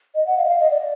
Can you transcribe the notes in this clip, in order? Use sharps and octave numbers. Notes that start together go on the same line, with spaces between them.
D#5
F#5
F5
D#5
F5
D#5
D5